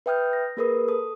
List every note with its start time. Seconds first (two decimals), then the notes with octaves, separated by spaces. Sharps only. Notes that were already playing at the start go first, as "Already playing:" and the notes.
0.06 B4 E5 G5 D#6 F6 G6
0.33 A#6
0.57 A#3 G#4 A#4 B4 D#6
0.88 A4 D#6